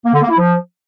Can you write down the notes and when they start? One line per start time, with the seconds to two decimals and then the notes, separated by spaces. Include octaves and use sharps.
0.05 A#3
0.13 D3
0.21 A#3
0.29 E4
0.38 F3